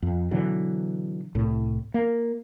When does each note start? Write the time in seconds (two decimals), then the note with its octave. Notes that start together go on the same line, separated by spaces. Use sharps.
0.02 F2
0.31 B2 D3 E3 F#3
1.35 C2 A2
1.94 A#3